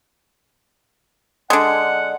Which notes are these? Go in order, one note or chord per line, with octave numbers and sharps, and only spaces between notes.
D3 G#3 F#5